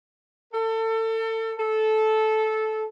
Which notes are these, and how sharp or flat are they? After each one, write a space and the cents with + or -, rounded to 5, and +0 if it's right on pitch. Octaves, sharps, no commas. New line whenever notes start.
A4 +30
A4 -15